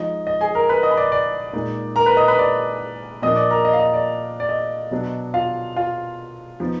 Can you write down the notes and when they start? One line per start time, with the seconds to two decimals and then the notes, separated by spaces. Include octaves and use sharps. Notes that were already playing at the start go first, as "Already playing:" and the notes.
Already playing: F3 G#3 D#4 D#5
0.27 D#5
0.41 G#4 G#5
0.55 A#4 A#5
0.69 B4 B5
0.83 D#5 D#6
0.91 B5
0.97 D5 D6
1.12 D5 D6
1.53 A#2 G#3 D#4
1.96 A#4 A#5
2.06 B4 B5
2.17 D#5 D#6
2.28 B4 B5
2.39 D5 D6
3.22 A#2 F3 A#3 D4 D#5 D#6
3.36 D5 D6
3.51 A#4 A#5
3.65 D#5
3.73 F5
3.79 D#5
3.94 D5
4.40 D5
4.49 D#5
4.91 B2 F#3 D4
5.34 F4 F5
5.76 F4 F5
6.60 F3 B3 D#4